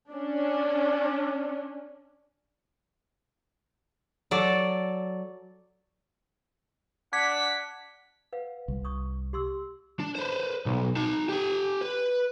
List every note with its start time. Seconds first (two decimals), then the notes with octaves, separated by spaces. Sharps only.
0.11 C#4 D4
4.31 F#3 A4 D5
7.13 D4 F#5 D6 G#6 B6
8.33 B4 F5 F#5
8.68 C2
8.85 C#6 D#6
9.33 G4 C6 E6
10.00 D4
10.16 B4 C5
10.66 B1
10.96 D#4 A5
11.29 G4 G#5
11.81 B4